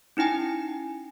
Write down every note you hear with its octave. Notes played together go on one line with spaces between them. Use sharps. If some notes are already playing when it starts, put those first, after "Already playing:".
C#4 D#4 E4 G5 G#5